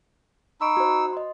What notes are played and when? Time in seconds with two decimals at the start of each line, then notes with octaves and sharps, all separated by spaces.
0.61 D#4 B5 C#6 E6 D7
0.77 F#4 C5
1.13 D#5 C6